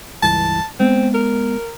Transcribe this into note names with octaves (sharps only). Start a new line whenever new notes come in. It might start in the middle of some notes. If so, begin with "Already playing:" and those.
C#2 G2 E3 A5
G#3 B3 C4
A#4